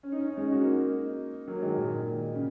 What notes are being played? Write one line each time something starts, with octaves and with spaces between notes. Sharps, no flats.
C#4
D#4
C#4
D#4
G#3 C#4
F#4
A#3 D#4
F#3 A#3
D#3 G#3
A#2 D#3
C#3